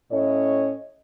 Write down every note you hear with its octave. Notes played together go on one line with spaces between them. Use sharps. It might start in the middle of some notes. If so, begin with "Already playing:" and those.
A2 C#4 C#5 D#5